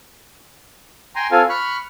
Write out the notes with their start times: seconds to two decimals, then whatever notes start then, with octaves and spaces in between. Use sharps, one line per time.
1.16 G5 G#5 A#5 C6
1.31 C4 F4 A4 F5 G#5
1.49 B5 C#6 F6 F#6